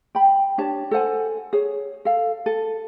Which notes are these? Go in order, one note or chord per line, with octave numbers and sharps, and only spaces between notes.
G5 B5
D4 G4 C#5 A5
A4 C5 F#5 G#5
G#4 C#5
A4 F5
A4